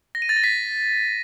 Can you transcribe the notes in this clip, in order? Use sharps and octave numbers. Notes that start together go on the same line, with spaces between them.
A#6
D#7
A6
A#6
B6